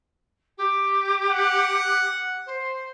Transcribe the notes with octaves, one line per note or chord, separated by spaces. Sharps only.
G4
F#5
C5